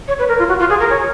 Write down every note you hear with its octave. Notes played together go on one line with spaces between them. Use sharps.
C#5
B4
A#4
F4
F#4
F4
G#4
A#4
C#5